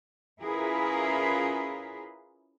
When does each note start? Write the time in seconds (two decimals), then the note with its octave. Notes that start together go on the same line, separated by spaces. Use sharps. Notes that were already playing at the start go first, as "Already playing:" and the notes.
0.43 C#4 E4 F4 G#4 A#4 B4